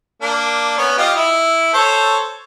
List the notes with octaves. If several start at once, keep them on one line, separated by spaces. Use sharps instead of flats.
A#3 D4
B3 C#4
F4 G4 D#5
E4
A4 C5 C#5